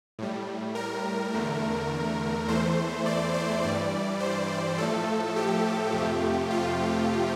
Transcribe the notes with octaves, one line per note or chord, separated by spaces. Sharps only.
A2 G3
A#4
E2 D3 A3
E2 E3 A3 C5
D5
C5
G2 E3 G3 D5
C5
A2 F3 A3 A4
G4
F2 C3 F3 A3
F4